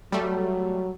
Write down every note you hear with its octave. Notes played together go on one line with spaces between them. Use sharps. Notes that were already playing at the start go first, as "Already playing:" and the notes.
F#3 G3 A3